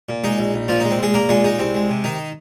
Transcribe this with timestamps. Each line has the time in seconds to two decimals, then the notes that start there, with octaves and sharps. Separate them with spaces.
0.09 A#2
0.24 G#3 D#4
0.39 A#1
0.54 A#1
0.68 A#2 F3 F4
0.80 G#3 D#4
0.91 C4
0.99 A#1 G#3 G#4
1.14 A#1 A#3 A#4
1.29 A#2 G#3 G#4
1.44 G#3 D#4
1.59 C2 C4
1.75 G#3
1.89 C3
2.04 D#3 D#4